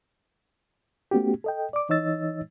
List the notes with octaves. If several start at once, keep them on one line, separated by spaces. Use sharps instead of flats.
A3 B3 C#4 F#4 G4
A4 D#5 G5
D5 D6
E3 D#4 C#5 D#5 E6 A6